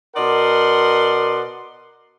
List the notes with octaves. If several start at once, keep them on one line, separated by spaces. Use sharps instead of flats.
B2 A#4 D5 D#5 F#5 C6